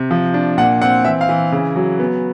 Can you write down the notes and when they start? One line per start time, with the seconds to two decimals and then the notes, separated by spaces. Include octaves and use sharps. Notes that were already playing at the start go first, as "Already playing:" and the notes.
Already playing: C3
0.11 F3
0.34 D4
0.58 A#2 F#5
0.82 C4 F#5
1.05 E3 E5
1.21 F5
1.29 E3
1.52 C#3
1.76 F#3
1.99 B3